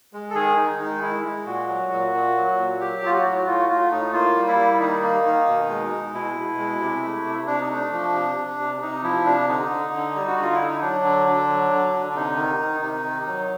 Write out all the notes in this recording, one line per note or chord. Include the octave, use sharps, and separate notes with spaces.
G#3
A4
D#3 G#4
D#3 D#4
G#3 D#4
G#3 E4
G#3
A#2 F#4
F#3
A#2
A#2
F#3
A#2
F#3 G4
F#3 F4
F#4
A2
F#4
A3 F4
F#4
A3 F4
A2 D#4
A#3 F4
G3
E4
G3
D#3 D#4
A#3
D#3
B2
G#3
G#3
B2 E4
B2
G#3
C3
A3
C3
C3 D4
D#4
A3 D4
F3
C3
C3
C3
C3 D#4
F3 E4
C3 D4
D3 D#4
D3
D3
G3
F#4
D3
F4
D3 E4
D#4
F#3 D4
D3
D3
F#3
D3
D3
D4
C3 D#4
D#3
D#3
C3 D#4
D#3
F#3